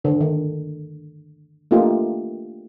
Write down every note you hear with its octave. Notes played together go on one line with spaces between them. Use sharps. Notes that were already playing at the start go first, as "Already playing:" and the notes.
D3 D#3
D#3
A3 A#3 D4 D#4 F4 G4